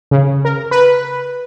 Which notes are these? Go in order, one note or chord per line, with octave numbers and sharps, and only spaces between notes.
C#3
A#4
B4